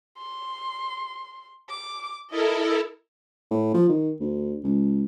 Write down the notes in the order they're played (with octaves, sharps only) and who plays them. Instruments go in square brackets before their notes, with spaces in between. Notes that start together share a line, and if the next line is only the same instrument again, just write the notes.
[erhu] C6
D6
[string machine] E4 A4 A#4 [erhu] D#5
[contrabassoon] A2
F3
D#3
D2
C#2